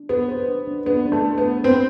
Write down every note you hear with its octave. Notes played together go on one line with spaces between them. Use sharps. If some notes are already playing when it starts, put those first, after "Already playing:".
Already playing: D4
B3 G4
C5
D4
D4
B3 D4
D4
A3
B4
B3
D4
C4 B4